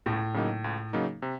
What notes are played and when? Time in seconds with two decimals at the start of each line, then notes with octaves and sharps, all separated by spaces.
0.06 C#2 A2
0.34 C#3 F#3 A#3 D#4
0.64 C#2
0.93 C#3 F#3 A#3 D#4
1.22 C3